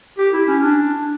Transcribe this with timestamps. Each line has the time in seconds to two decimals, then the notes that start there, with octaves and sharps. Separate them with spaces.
0.18 G4
0.33 E4
0.48 C#4
0.62 D4